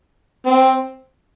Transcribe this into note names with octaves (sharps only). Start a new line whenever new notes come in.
C4